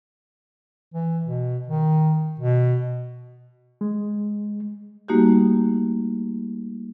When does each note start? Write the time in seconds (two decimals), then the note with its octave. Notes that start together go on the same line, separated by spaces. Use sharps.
0.94 E3
1.25 B2
1.68 D#3
2.40 B2
3.81 G#3
5.08 G3 A3 A#3 D#4 F#4 G4